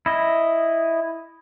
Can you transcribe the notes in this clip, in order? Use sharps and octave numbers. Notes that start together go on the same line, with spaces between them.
E4 D#5